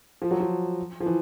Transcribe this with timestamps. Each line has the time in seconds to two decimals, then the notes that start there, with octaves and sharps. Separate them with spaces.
0.22 F3
0.31 F#3
0.40 F3
1.01 F3
1.06 E3